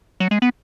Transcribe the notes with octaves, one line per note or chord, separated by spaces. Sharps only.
F#3
G#3
B3